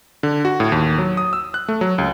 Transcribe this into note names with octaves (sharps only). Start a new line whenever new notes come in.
D3
F#4
A2
D#2
F#3
D#6
E6
F#6
A3
F#3
C#2